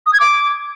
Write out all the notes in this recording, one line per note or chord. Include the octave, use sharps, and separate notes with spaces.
D#6
G#6
D6